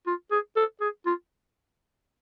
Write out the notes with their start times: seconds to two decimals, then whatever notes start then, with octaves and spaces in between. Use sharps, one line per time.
0.07 F4
0.31 G#4
0.56 A4
0.81 G#4
1.06 F4